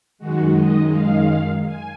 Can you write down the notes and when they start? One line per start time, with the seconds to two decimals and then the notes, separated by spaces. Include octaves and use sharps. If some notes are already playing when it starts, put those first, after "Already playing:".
0.18 F#2 D#3 G#3 F#4
0.55 D#5
0.92 F5
1.66 G#5